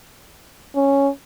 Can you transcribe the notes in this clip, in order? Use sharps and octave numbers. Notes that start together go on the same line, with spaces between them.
C#4